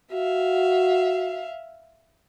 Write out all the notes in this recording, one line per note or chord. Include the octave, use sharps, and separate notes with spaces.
F#4 E5 F5